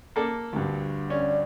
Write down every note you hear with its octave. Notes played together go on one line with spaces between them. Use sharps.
A#3 A4 D5
D2 G2
C#4 D5